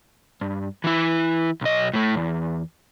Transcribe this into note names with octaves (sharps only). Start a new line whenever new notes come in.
G2
E3 E4
B1 D#5
A2 A3
E2